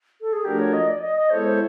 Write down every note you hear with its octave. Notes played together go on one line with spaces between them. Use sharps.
A4
G#4
F3 A3 D4 F#4 G4 A#4
C#5
D#5
D5
D#5
D#5
G#3 B3 E4 A4 C5 C#5
C5